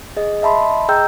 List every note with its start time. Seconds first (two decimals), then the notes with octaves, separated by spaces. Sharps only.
0.17 G#4 D#5
0.42 D#5 E5 A5 B5 C6
0.89 G#4 D#5 G5 A#5 E6 G6